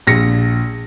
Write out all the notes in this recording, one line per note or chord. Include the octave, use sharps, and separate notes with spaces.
A#1 A#6 C#7